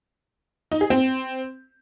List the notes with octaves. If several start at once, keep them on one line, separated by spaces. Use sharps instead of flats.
D#4
G#4
C4